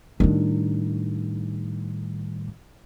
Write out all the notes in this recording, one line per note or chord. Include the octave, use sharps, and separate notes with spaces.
A2 D#3 G3 D4 D#4